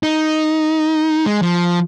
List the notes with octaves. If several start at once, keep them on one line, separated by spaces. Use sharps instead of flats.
D#4
G#3
F3